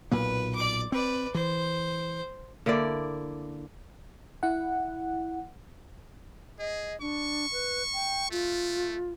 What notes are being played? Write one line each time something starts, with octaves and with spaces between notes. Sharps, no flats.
B1 A#2 A#3 B4
D5 D6
C4 B4 D5
E3 C5
D3 A#3 E4 D5
E4 F#5
G#4 D#5
D4 C#6
B4
G5
A3 F4